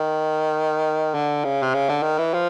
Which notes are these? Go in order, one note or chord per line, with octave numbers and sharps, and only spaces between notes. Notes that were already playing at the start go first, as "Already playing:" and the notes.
Already playing: D#3
D3
C#3
C3
C#3
D3
D#3
E3
F3